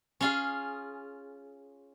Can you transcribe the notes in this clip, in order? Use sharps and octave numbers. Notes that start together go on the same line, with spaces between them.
C#4 F4 G#4